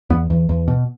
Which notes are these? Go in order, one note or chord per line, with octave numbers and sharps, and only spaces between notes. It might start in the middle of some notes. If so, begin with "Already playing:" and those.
E2 B3
E2
E2
B2